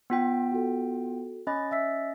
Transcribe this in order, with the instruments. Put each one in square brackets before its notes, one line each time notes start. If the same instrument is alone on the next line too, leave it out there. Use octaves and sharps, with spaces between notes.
[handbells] B3 F4 G5
[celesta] F#4 A4
[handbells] C#4 D#5 A6 [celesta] B5
[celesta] E5 E6 B6